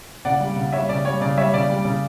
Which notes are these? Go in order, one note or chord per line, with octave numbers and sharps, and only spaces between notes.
C#3 D5 F#5
G3
C#3
G3 C#5 E5
C#3 D5
G3 C#5
C#3 D5
G3 C#5 E5
C#3 D5
G3
C#3